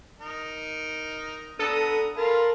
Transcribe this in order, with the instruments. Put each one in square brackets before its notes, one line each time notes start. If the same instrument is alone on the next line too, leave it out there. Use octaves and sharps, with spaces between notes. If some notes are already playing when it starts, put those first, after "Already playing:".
[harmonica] D#4 A#4
[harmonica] B3 A#5 D#6 [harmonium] D4 [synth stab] A4
[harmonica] F4 B4 F5 [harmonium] A#4 A5